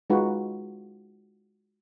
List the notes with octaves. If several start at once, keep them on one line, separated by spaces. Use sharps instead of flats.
G#3 D#4 F4 F#4 B4